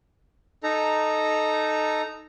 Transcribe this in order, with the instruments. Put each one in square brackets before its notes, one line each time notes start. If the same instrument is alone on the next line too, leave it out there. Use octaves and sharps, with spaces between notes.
[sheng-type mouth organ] D#4 A4 A#5